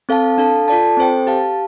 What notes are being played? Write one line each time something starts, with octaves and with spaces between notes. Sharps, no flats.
C4 A4 F5 A5
D4 A4 F5 A5
F4 A4 D5 A5
C4 A4 C5 G5
G4 F5 A5